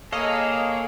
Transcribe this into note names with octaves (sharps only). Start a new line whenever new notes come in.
A#3 G#4 A4 C#5 D#5 F5